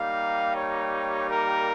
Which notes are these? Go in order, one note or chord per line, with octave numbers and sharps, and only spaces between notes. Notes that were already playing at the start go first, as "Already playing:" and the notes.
Already playing: G3 A#3 D#4 G4 F5
C#5
A#4